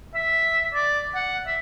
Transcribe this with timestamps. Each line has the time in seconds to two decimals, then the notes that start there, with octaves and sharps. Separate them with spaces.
0.15 E5
0.74 D5
1.15 F#5
1.47 E5